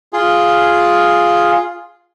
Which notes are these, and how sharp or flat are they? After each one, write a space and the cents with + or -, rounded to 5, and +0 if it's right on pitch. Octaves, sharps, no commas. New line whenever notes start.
F4 +0 G#4 +0 F5 +0